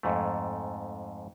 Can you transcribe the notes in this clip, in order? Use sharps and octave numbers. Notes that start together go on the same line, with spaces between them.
F2 G#2 A3